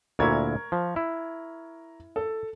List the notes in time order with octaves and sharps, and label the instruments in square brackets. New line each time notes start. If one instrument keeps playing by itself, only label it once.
[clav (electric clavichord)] D2 A#2 E4 [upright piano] A#4 C#6 G#6
[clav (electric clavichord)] F3
E4
[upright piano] A4